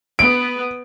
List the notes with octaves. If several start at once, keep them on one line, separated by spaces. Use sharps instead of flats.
B3 D7